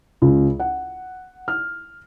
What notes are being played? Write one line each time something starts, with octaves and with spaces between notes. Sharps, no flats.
C#2
F#5
F6